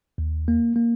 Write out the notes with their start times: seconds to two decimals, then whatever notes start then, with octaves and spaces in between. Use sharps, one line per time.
0.18 D#2
0.48 A#3
0.76 A#3